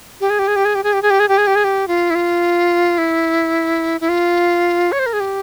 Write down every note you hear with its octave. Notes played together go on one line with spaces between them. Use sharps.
G4
G#4
G4
G#4
G4
G#4
G4
G#4
G4
G#4
G4
G#4
G4
G#4
G4
G#4
G4
F4
E4
F4
E4
E4
F4
C#5
C5
A#4
G#4
G4